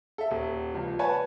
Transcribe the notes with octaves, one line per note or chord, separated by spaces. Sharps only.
A4 E5
D#1
C#2 F3
B4 C#5 F#5 G#5 A5